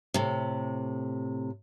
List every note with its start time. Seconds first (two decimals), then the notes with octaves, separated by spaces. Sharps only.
0.14 A2 C3